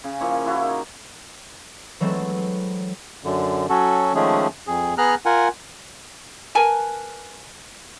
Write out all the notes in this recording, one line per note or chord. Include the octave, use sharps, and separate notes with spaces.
C#3 G#4
F3 A#3 E4 C#5
E4 F#4 A#4
D#4
E3 F#3 G#3 A3 C4
F#2 D3
F#3 C#4 F#4 A4
D#3 F3 G#3 A3 C#4 G#4
F2 G#4
B3 G#4 A#5 F6 F#6
F4 A#4 F#5 G#5
A#4 B4 G#5 A5